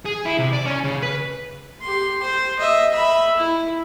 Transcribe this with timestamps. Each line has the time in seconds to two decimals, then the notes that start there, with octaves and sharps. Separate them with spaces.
0.06 G#4
0.26 E4
0.39 C3
0.53 D5
0.66 C#4
0.84 C#3
1.03 B4
1.81 G4 C6
2.22 C5
2.59 D#5 E5
2.92 E5 B5
3.36 E4